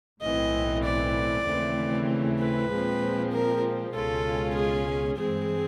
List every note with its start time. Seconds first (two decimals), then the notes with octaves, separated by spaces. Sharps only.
0.21 B1 A2 E3 A3 C4 D#5
0.84 D5
1.45 D#2 C#3 E3 A3 C4
2.39 B4
2.69 A#2 F3 G#3 C4
3.32 A#4
3.93 C#2 B2 G#3 C#4 F4 A4
4.55 G#4
5.17 G2 E3 G#3 C4 G#4